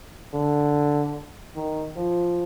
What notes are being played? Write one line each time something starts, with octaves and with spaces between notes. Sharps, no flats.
D3
D#3
F3